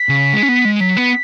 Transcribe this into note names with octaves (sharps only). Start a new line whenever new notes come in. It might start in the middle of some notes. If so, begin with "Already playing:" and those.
Already playing: B6
C#3
G#3
C#4
B3
G#3
F#3 B6
B3